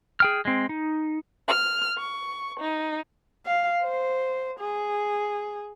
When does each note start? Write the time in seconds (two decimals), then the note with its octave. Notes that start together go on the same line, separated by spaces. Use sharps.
0.20 G#4 G5 F6
0.45 G#3 C4
0.69 D#4
1.50 F6
1.99 C#6
2.59 D#4
3.46 F5
3.82 C5
4.60 G#4